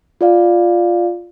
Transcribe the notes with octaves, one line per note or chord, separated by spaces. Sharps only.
F4 D5 F5